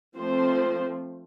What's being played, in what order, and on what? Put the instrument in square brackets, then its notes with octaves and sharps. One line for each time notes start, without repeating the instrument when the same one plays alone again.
[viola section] F3 A3 C4 C5